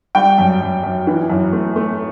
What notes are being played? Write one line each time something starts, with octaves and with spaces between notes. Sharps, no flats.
G3 G5
F#2
F#2
F#2
E3
F#2
A3
A3